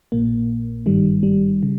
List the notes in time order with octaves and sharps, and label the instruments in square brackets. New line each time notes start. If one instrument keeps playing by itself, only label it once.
[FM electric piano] A#1 A#2 A#3
G#1 G2 D#3 G3
G3
C#3